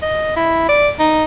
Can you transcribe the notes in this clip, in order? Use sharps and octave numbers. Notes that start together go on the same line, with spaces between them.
D#5
E4
D5
D#4